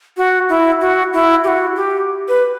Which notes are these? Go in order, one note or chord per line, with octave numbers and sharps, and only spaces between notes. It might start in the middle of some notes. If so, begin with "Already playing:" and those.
F#4
E4
F#4
E4
G4
F#4
G4
B4